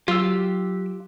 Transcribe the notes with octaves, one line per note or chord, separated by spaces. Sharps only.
F#3 F4 G4 E6